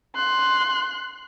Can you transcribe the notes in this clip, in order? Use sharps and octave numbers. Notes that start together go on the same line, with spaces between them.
C6 F#6